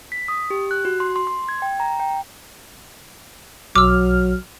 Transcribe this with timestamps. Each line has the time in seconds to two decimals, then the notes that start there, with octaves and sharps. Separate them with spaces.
0.12 B6
0.28 D#6
0.50 G4
0.71 F#6
0.85 F#4
1.00 C6
1.16 C6
1.27 C6
1.49 G#6
1.62 G5
1.80 A#5
2.00 G5
3.76 B1 F#3 D6 E6 F6